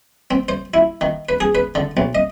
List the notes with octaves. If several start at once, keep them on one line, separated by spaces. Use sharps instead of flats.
C4
C5
E4
D#3
B4
G#4
B4
D3
B1
D#5